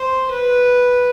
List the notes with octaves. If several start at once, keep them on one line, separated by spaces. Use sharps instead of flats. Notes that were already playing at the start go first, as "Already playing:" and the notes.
Already playing: C5
B4